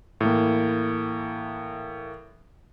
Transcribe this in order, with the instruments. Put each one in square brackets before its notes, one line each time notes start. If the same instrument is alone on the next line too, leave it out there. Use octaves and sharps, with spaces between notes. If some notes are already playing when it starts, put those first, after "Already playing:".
[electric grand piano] A2 E3 A#3